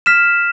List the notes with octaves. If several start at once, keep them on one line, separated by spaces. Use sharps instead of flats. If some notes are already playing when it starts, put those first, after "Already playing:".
F6 B6 E7